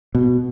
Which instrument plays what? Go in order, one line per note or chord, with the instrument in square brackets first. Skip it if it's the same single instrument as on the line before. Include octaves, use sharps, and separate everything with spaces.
[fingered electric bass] B2